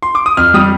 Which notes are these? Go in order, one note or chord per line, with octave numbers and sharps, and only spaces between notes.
C6
D6
D#6
F2 F6
G3 D#6